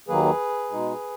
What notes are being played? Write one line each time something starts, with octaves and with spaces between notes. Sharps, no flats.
D#2 D#3 F#3 A#3 G#4 B4
B2 G#3 D#4